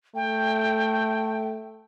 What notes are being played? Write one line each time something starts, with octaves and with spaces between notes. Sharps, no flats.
A3 G5